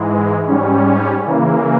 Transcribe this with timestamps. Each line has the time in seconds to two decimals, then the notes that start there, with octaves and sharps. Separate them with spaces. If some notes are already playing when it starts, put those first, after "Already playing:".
Already playing: G#2 E3 G#3
0.47 G#2 G3 C#4
1.25 C#3 E3 A#3